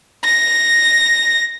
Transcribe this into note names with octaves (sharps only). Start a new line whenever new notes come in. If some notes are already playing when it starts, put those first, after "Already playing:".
A#6